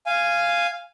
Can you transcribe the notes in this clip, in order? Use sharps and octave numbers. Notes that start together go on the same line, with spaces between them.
F5 G#5